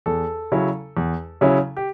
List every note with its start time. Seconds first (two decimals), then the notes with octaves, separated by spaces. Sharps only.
0.06 E2 A4
0.52 C#3 F#3 C#4 E4
0.97 E2
1.41 C#3 F#3 C#4 E4
1.77 G4